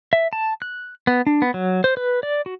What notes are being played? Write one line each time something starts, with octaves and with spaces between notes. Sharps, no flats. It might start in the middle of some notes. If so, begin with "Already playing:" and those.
E5
A5
F#6
B3
D4
B3
F#3
C5
B4
D5
F#4